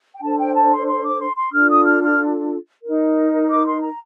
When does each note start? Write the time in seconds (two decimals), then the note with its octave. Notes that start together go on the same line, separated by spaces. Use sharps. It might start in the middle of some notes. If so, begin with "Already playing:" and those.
0.14 G5
0.21 D4 A4 C5 A5
0.37 G5
0.54 A5
0.65 A#5
0.71 C6
0.86 C6
1.03 D6
1.19 C6
1.35 C6
1.52 D4 F4 A4 F6
1.69 D#6
1.84 F6
2.02 F6
2.82 D#4 A#4
3.49 D6
3.65 C6
3.81 A#5